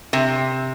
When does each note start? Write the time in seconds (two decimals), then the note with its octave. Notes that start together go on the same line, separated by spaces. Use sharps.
0.13 C3